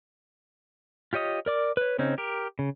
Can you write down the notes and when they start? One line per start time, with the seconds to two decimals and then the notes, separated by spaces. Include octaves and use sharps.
1.13 F4 G4 C#5 D#5 D#6
1.46 A#4 D5 D6
1.77 B4 C#5
1.99 C#3 C4 C#4 D#4
2.18 G4 A#4
2.59 C#3